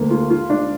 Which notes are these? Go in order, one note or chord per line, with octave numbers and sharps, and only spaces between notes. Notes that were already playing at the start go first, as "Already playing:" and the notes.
Already playing: D2 A#3
F4
F4
D4